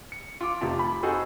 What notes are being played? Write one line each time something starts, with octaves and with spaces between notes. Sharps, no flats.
C#7
F4 D6
F1 C3 F4 A5
B5
C4 D#4 F#4 G#4 A4 C5